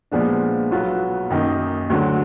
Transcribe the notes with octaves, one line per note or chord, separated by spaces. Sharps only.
A#2 F3 G#3 B3 D4
B1 B2 F#3 B3 F4
F#2 D#3 A#3 D#4
D2 D3 F#3